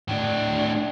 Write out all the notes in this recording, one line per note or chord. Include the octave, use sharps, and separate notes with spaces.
A2 D4